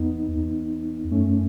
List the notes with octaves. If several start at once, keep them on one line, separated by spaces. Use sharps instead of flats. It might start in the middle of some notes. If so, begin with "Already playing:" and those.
Already playing: E2 B3 D#4
E2
F#2 A3 C#4